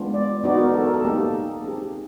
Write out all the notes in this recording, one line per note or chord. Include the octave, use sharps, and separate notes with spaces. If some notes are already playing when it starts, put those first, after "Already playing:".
Already playing: G#3 B3 D4 F4
D5
B3 D#4 F#4 D5
A#4
A4
A#4
A4
A#3 D#4 G4
C4 D#4 G4 G#4